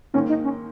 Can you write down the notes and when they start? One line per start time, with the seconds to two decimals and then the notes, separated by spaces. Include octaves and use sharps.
0.14 G#2 D#3 A#3 C#4
0.29 D#4
0.44 C#4